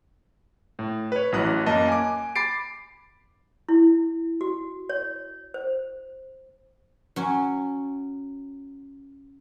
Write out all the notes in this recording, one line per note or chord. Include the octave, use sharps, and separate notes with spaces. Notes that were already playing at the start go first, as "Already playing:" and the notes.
A2
B4 C#5
A1 E3 F#3 D#6 F#6
F#2 A#3 D#5 A5
G#5 D6
B5 D6 A6 C7 D7
E4
F#4
C#5
C5
F#3 C#4